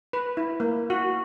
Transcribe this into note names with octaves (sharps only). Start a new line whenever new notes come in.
B4
E4
A#3
F#4